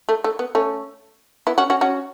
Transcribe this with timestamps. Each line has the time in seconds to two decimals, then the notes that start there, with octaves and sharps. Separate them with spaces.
0.09 A3
0.24 A3
0.39 B3
0.55 A3 C#4
1.47 B3 E4
1.58 C#4 F#4
1.70 C#4 F#4
1.81 C#4 F#4